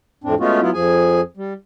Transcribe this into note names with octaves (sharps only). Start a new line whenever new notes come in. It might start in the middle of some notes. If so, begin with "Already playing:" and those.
F2 A2 C4 D4
G#3 A3 B3 C#4 F4 F#4
F#3 B3 E4 F4
F2 F3 G#4 G#5
G3